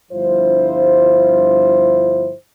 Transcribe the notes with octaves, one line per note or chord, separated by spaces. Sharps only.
G1 G2 F3 E4 F4 C5